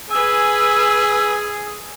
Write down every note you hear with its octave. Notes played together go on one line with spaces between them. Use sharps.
G#4 B4 G#5 E6